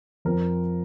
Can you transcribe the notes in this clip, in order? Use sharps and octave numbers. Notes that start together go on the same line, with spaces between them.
F2 F3 C4 A#4